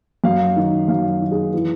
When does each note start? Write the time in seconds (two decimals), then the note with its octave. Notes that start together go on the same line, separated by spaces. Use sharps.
0.24 F#2 F5
0.56 D#3
0.88 F#2 F5
1.21 D#3
1.31 G#4
1.54 E3